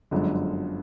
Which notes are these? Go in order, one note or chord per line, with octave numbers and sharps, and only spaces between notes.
G1 F#2 D3 F3 G#3